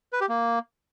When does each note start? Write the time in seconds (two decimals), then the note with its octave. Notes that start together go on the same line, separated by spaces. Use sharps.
0.13 B4
0.21 G4
0.29 A#3